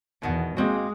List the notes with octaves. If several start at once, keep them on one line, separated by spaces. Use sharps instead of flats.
E2 B2 D#3 F#5
G#3 A#3 C4 F#4